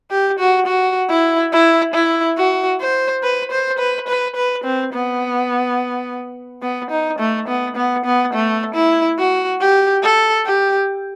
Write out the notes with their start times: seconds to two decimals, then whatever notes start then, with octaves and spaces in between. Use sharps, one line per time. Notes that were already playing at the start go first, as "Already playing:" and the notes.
0.11 G4
0.39 F#4
0.67 F#4
1.10 E4
1.53 E4
1.94 E4
2.37 F#4
2.81 C5
3.23 B4
3.52 C5
3.79 B4
4.08 B4
4.36 B4
4.64 C4
4.93 B3
6.62 B3
6.91 D#4
7.19 A3
7.48 B3
7.76 B3
8.05 B3
8.34 A3
8.75 E4
9.18 F#4
9.61 G4
10.04 A4
10.46 G4